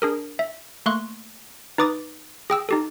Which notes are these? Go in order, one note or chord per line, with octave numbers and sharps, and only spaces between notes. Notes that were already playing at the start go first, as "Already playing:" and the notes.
D4 G#4 A#4
E5
A3 A#3 C6 C#6 F#6
D#4 B4 D6 D#6 A6
G#4 G5 E6
D#4 G4 A4